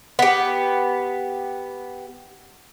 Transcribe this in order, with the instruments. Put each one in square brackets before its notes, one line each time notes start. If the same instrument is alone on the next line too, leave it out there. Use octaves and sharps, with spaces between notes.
[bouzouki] B3 G4